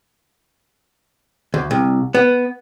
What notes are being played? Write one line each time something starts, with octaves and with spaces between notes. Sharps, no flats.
D2
C2
B3